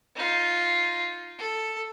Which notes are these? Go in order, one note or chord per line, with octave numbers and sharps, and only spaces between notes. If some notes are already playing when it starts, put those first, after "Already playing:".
D#4 F4
A4